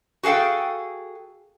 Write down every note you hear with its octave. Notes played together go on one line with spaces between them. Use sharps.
F#4 G#4 A4 F5 G5